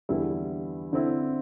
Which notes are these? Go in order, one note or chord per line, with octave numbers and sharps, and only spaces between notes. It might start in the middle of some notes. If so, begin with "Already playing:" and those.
E2 D3 G3 E4
D3 C4 E4